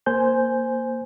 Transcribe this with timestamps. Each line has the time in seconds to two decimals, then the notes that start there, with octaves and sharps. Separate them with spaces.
0.06 A#3 C5 G#5 G6